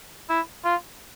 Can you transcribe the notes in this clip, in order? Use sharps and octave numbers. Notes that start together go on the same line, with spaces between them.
E4
F4